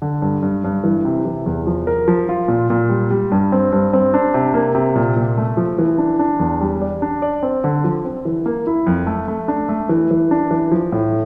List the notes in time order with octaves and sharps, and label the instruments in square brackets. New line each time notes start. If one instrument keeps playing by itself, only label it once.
[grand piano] D3
G2
G2
G2
E3
C3
E3
E2
F3
A#4
F3
F4
A#2
A#2
G3
G3
G2
C4
G2
C4
D4
C3
A#3
C3
A#2
A#2
A3
F3
E3
D4
D4
E2
G3
D5
D4
D5
C4
D3
F3
C4
E3
A#3
E4
F2
A3
A3
D4
A3
E3
E3
D4
E3
F3
A2